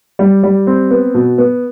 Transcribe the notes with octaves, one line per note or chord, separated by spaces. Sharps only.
G3
G3
C4
B3
B2
B3